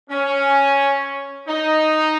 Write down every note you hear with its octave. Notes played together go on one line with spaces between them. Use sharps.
C#4
D#4